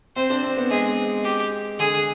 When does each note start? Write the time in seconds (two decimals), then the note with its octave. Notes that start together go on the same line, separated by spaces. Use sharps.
0.16 C4 C5
0.30 D4
0.43 C4
0.57 B3
0.70 G#3 G#4
1.24 G4
1.79 D3 G#4